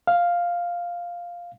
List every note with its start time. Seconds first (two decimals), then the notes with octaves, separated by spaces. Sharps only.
0.07 F5